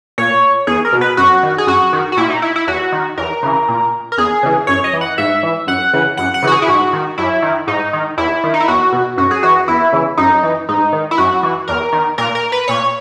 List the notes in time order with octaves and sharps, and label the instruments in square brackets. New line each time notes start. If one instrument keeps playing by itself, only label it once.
[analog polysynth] A#2 C#5
E2 G#4
A#4
B2
B4
F#2 F#4
D#3
G#4
F#2 F#4
D#3
F#4
A#2 E4
D#4
E4
E4
E2 F#4
D#3
E2 A#4
C#3 E3
A#2
A#4
E2 G#4
C#3 E3
F#2 C#5
D#5
E3
F#5
G#2 E5
E3
F#2 F#5
C#3 E3
F#2 F#5
F#5
C#3 E3 F#4
G#4
E4
G#2 F#4
D#3
F#2 E4
D#3
G#2 D#4
D#3
E2 E4
D#3
D#4
E4
E2 F#4
B2
F#2 F#4
G#4
E3 F#4
E2 E4
C#3 E3
F#2 D#4
E3
G#2 D#4
D#3
E4
F#2 F#4
E3
E2 A#4
D#3
A#2 A#4
A#4
B4
A#2 C#5